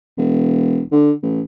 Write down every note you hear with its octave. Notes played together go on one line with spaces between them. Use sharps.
E1
D3
A1